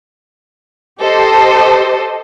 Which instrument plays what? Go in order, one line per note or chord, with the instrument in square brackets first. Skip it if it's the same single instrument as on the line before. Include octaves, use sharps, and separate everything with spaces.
[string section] G4 A4 C5 D#5